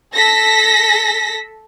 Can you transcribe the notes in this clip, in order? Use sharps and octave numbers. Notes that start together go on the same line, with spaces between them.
A4 A#6 B6